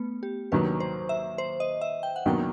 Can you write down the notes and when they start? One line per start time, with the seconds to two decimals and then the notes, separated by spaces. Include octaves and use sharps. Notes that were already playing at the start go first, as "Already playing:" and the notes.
Already playing: A3 B3
0.23 G4
0.52 D#2 D#3 F#3 B4
0.80 C5
1.09 E5
1.38 C5
1.60 D#5
1.81 E5
2.03 G5
2.16 F#5
2.26 D#2 D#3 F#3 B3 G5